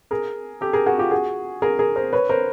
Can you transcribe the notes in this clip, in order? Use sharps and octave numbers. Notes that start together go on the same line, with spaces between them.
G#4 A#4
G4 A4
G#4 A#4
F#4 G#4
F4 G4
F#4 G#4
G#4 A#4
G#4 A#4
A#4 C5
B4 C#5
A#4 C5